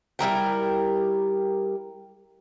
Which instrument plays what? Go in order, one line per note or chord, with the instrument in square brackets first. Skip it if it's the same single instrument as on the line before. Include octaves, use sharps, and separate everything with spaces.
[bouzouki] G3 E4 A#4 G5